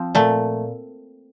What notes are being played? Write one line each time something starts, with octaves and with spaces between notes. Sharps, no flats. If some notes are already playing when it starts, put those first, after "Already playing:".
Already playing: F3 C4
A#2 A3